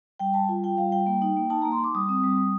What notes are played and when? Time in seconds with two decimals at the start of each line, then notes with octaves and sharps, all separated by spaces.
0.19 G3 G5
0.34 G3 A5
0.49 F4
0.63 F4 G5
0.78 G3 F5
0.92 G3 G5
1.06 A#3
1.22 D#4
1.37 A#3
1.50 D#4 A5
1.62 A#3 A#5
1.72 C6
1.79 D#4 D6
1.95 G3 D#6
2.09 C4
2.24 G3
2.38 G3